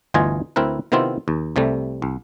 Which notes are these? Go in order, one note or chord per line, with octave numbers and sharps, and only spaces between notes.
G1 D2 E3 F4 D#5 G#5
D2 C4 E4 A#4 B4
C3 D#3 B3 C4 E4 F4
D#2
C2 C3 G3 A3
C2